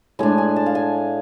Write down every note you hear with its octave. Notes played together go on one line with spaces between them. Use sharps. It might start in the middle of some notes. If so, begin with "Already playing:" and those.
A2 G#3 D4 G#5
G#5
A5
F5
G#5